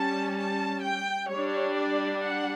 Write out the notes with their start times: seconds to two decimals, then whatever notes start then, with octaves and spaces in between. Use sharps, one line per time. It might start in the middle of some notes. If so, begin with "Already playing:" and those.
Already playing: G3 C#4 A5
0.37 A5
0.83 G5
1.29 G3 D4 C#5
1.76 D5
2.22 F#5